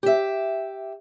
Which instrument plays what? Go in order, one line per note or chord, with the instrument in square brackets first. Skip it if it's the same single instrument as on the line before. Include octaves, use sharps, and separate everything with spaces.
[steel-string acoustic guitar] G4 E5